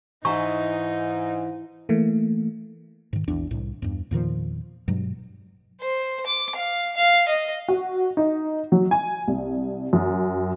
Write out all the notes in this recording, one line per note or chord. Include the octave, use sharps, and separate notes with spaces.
G#2 E3 D#4 A#5 C#6
E3 A3 A#3
G#2 D#3
A#1 E2 D4
C2 A2
E2 G2
E2 A#2 D#3 F3
G2 B2 F#3 G#3
C5
D6
F5
F5
D#5
F#4
D#4
F#3
G#5
C2
F#2